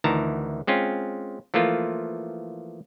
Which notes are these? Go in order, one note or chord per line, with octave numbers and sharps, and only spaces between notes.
D2 D#3 E3 A5 A#5
G#3 C4 C#4 F4
E3 F3 A3 A#3 F4